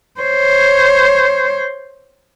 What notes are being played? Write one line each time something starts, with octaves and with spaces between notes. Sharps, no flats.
C5 C#5